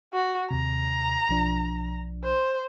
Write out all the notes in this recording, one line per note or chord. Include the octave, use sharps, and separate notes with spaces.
F#4
D#2 C3 A#5
B1 F3 D4
C5